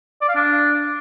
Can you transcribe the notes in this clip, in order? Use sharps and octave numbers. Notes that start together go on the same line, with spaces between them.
D5
F5
D4